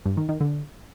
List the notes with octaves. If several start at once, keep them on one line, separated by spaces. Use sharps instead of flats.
G2
D#3
D#3
D3